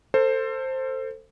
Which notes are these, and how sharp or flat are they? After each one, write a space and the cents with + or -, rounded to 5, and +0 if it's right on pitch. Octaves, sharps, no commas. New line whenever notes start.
A4 +30 C5 +5